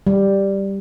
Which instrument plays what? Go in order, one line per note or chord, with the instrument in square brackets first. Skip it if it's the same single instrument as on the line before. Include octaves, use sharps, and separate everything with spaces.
[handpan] G3